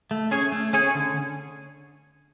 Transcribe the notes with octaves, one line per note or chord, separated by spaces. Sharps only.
A3
C#4 G#4 C#5
A3
C#4 G#4 C#5
D3